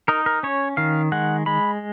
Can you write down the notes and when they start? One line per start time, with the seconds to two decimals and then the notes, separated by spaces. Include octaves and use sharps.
0.08 D#4 A#4
0.26 A#4
0.43 C#4 C#5
0.77 D#3 F5
1.12 G#3 F#5
1.46 G#3 B5